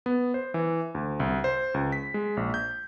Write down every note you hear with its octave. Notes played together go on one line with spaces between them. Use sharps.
B3
C5
E3
D2
C2
C5
C#2
B6
G#3
A#1
G6